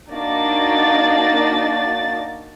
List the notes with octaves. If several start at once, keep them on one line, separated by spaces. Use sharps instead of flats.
A#3 D4 D#4 F#4 D5 A6